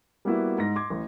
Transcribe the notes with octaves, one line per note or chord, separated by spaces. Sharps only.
G3 A#3 B3 E4 F#4 E5
G#2 A#6
C6 D6 G#6
A1